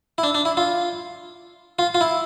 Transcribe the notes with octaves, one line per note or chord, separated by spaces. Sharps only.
E4
D4
D4
E4
F4
F4
F4
E4